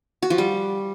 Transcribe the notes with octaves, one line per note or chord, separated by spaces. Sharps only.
F#4
F3
G3